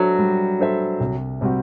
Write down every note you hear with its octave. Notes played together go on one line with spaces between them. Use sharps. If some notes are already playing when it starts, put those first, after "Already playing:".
Already playing: F#3 D4 A4 C5 E5
G3
D4 A4 C5 E5
C2
C3 G3 C4 F#4